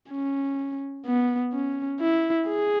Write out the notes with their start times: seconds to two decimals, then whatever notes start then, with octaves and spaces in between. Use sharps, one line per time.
0.11 C#4
1.06 B3
1.53 C#4
2.00 E4
2.48 G#4